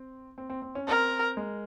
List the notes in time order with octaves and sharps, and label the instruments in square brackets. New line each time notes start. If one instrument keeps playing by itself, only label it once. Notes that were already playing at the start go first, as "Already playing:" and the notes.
Already playing: [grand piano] C4
C4
C4
C4
C#4
[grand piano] C4 [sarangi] A#4
[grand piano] G#3